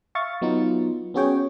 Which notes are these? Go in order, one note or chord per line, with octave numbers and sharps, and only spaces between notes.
E5 F5 C#6 A6
F#3 B3 D#4 F4
B3 C#4 F#4 G#4 C#5 G5